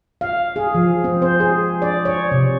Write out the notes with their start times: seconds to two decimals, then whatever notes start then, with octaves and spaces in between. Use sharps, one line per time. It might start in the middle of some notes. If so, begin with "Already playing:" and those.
0.21 F5
0.56 G#4
0.75 F3
1.04 C4
1.22 C5
1.40 G#4
1.82 D5
2.05 C#5
2.32 C3